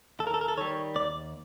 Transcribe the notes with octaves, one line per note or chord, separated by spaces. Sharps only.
D#2 A4
A#4
A4
A#4
A4
D#3 G3 C#5
D#2 D5